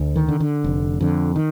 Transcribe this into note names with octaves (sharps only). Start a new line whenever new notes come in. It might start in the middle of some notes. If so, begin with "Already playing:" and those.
Already playing: D2
D#3
D3
D3
F1
F2 D3
D#3